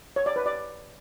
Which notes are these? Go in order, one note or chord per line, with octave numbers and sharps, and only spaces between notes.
C#5
D5
B4
D5